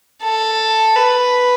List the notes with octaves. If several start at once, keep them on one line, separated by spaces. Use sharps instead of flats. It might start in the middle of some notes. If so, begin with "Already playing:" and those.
A4
B4